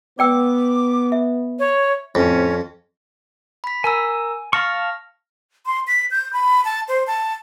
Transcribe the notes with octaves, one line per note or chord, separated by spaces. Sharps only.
B3 D5 G5 D6 E6
E5
C#5
F2 A2 C4 C#4
B5 B6
A#4 G#5 A#5 E6
F5 A5 C#6 F6 A#6
C6
B6
G6
B5
A5
C5
A5